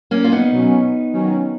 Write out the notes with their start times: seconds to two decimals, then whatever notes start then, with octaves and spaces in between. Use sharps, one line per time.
0.11 A#3 C#4
0.24 F4
0.32 B3 D#4
0.52 B2 F#3 C#4
1.13 D#3 F#3 C#4